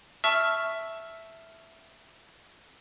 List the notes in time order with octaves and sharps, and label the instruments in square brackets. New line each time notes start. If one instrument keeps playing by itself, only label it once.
[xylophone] E5 A5 C#6 E6 F6